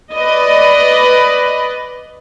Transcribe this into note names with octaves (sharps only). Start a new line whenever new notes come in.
B4 D5 D#5